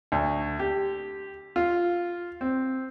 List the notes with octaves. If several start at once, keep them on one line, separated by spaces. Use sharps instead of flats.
D2
G4
F4
C4